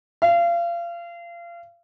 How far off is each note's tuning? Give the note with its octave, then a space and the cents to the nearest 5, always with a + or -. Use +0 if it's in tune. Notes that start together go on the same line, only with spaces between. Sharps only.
F5 -30